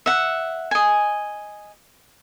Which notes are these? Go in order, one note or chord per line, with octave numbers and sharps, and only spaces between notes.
E5 F#5
D#5 G#5